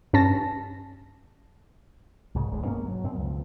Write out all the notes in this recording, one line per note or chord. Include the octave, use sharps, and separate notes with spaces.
G2 C#4 A5 A#6
C2 G#2 C#3
D#1 B1 D3 G#3
G2 B2 A#3 C#4
F#3
F#2 B2 C4
C#2 F3